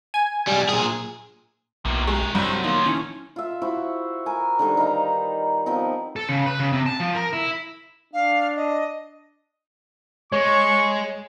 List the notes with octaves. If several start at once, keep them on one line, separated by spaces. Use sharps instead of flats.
G#5
B1 G3
A#2 G#4
B1 A2 A#3
G#3 A3 G4 A#4
C2 G2 F#3 G3 C4
A#2 D#3 F3 A#3
D#3 E3 C#4
F4 E5
E4 F#4 C5
A#4 G#5
D3 D#3 G3 D#4
D#4 B4 F5 A#5
F3 B3 C4 D#4
A4
C#3
B4
C#3
C3
A5
F3
A#4
E4
D4 F5
D#5
G#3 C#5 C#6